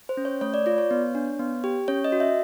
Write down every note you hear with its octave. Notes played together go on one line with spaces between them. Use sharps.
C5
C#4
C#5
A3 C#5
D5
F4 D5
C#5
B3
D4
B3
G4
C#4 C#5
D#5
F#4
E5